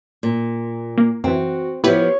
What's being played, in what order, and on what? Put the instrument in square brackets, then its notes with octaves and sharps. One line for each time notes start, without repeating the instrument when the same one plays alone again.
[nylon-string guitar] A#2
[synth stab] A#3
[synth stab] F#2 E3 [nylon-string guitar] C4 [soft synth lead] F#4
[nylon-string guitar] F3 B3 [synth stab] E4 G4 B4 [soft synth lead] C#5